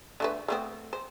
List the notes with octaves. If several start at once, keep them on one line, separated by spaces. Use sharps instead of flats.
D3 A3 B4
A3 B3 C4
C5